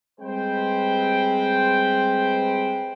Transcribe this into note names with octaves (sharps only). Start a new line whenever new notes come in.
G3 G#3 C4 B4 C5 G5